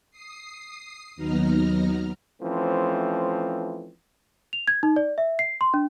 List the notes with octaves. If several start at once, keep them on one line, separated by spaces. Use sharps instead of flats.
D#6 C7
D#2 F#3 B3 D#4 A#5 F6
E3 F3 A3 C4 C#4
F7
G#6
D#4
D5
E5
C7
C6
D4